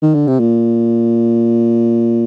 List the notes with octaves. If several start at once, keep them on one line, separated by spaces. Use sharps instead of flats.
D#3
D3
C3
A#2